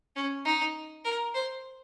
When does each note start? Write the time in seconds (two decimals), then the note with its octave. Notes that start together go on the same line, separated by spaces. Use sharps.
0.16 C#4
0.45 D#4
1.04 A#4
1.34 C5